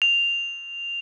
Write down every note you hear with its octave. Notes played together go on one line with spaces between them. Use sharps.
F7